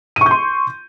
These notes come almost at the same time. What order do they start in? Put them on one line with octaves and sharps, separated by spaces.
D#7 C#6 G6 C6